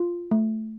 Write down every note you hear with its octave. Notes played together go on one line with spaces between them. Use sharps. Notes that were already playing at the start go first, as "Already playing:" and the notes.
Already playing: F4
A3